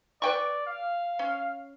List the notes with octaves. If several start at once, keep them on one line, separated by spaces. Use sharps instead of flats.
B4 D5 G5 C#6
F5
C#4